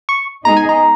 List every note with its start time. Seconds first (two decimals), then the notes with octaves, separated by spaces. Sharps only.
0.09 C#6
0.45 G#3 B3 D#4 G#4 D#5 A#5
0.57 G#5
0.69 A#5